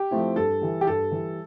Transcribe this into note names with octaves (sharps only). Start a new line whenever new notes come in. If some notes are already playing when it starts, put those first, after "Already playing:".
Already playing: G4
F3 A3 C4 E4
G2 A4
E3 G3
G4
G2 A4
E3 G3